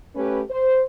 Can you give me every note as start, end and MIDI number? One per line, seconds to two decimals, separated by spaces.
0.14 0.40 57
0.14 0.40 61
0.14 0.40 67
0.14 0.40 71
0.49 0.82 72